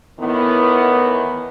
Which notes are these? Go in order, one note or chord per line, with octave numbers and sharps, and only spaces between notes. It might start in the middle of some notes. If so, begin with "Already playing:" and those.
A2 D#3 E3 B3